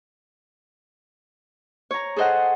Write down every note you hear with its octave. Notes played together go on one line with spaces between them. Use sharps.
C#5 A#5
G#4 A4 C5 D#5 F#5